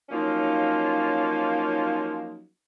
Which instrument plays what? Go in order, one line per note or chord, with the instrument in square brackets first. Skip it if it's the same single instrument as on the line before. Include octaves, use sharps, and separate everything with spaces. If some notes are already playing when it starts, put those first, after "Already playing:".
[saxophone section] F3 F#3 A#3 C#4 D#4